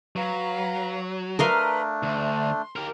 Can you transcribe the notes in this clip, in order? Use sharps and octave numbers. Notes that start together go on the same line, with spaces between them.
F#3 B4 F5 A#5
A3 D4 A#4 B4 D#5 F5 A#5 C6
D2 C6
G4 A#4